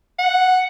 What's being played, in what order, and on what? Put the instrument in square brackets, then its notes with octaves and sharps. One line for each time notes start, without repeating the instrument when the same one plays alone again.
[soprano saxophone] F#5